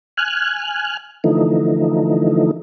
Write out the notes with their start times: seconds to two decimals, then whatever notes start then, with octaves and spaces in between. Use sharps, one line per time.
0.17 G#5 F6 F#6
1.24 D3 E3 F3 A3 D#4